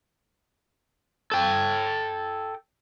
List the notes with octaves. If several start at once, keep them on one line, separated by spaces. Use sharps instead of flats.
A4 G5